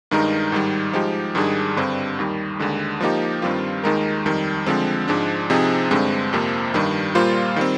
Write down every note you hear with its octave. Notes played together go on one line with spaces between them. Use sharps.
G2 D#3 G#3 D#4 A#4
G#2 D#3 G3
F3 G#3 D#4 G4
G#2 D#3 G3 D4 G#4
G2 D3 G3 C4
D#2 D#3 G3
D#2 D3 G#3
F3 A#3 D#4 G4
G2 D#3 G3 C4 F4
D#2 D#3 G#3 D#4 A#4
F2 D#3 G3
D3 F3 G#3 C4
G#2 F3 G#3 D4
C3 F3 C4 D#4 G#4
G2 D3 G#3 C4
F2 C3 F3 A#3
G2 D#3 G3
A#2 G3 A#3 F4 C5
D#3 G3 C4